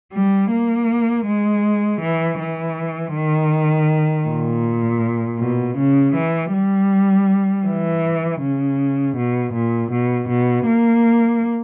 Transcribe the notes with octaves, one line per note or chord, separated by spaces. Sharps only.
G3
A#3
G#3
E3
E3
D#3
A#2
B2
C#3
E3
G3
E3
C#3
B2
A#2
B2
B2
A#3